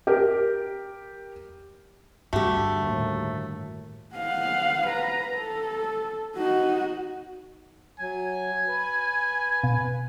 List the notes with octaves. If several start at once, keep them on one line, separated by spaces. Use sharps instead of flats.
G4 A#4
G2 D3 A3 F#4 G4
D#2 A2
F5 F#5
B4 A#5
A4
D#4 F#4
F#3 G#5
B4
B2